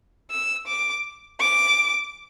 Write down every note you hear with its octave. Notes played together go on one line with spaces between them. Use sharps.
E6
D6
D6